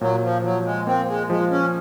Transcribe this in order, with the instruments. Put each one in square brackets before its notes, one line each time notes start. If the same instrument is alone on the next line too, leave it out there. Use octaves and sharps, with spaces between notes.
[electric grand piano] A#2 [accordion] F#3
[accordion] F3
[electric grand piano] F3 [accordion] F#3
[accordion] G#3
[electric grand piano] A#3 [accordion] C4
[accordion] G#3
[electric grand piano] F3 [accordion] G#3
[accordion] C#4